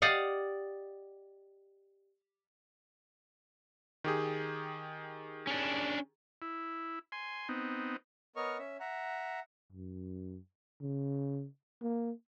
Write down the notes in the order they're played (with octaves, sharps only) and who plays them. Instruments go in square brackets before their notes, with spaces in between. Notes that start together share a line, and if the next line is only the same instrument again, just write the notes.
[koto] G4 D5 D#5 F5 F#5
[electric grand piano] D#3 G4 G#4
[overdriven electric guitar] C#4 D4
[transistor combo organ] E4
G#5 C6
B3 C4 D#4
[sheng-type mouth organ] B3 A#4 C#5 D#5 C#6 F6
C#4 E5
E5 F#5 A#5
[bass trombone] F#2
C#3
A#3